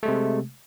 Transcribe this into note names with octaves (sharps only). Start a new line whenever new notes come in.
C3 G#3 A3